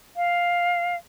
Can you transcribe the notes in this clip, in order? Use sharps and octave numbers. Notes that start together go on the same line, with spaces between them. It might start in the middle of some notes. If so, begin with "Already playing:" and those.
F5